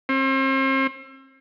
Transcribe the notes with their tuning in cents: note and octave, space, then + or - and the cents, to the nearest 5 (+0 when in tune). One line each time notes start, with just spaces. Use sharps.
C4 +40